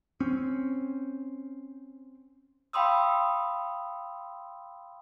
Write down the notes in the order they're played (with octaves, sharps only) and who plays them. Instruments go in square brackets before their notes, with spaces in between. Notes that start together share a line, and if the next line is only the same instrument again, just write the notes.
[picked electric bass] C4 C#4
[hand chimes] F5 G5 B5 C6 D#6 E6